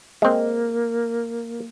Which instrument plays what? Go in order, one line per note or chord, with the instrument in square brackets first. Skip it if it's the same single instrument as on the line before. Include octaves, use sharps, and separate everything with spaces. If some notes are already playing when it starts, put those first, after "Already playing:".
[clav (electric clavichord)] G#3 C4 [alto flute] A#3